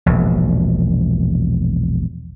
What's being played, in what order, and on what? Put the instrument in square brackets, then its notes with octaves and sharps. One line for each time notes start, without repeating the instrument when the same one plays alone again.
[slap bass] E1 A#1